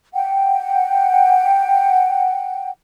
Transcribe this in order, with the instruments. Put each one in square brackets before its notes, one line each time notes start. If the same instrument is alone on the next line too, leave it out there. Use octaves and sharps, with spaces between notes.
[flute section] F#5 G5